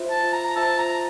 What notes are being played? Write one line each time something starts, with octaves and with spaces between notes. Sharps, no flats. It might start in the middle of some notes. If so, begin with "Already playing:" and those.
Already playing: F4 C5 E5
A5
A#5
F4 C5 E5 A5
A#5